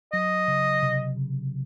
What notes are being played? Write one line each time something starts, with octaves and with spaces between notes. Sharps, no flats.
F#3 D#5
C#3
C3
C#3